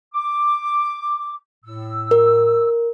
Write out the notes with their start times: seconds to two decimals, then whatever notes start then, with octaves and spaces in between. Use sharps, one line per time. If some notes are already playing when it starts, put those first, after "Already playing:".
0.14 D6
1.65 A2 E6
2.11 A#4